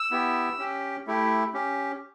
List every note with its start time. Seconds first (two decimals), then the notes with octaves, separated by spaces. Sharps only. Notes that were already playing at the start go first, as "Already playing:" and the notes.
Already playing: E6
0.11 B3 E4 G4
0.58 C#4 G4
1.07 A3 E4 G4
1.53 C#4 G4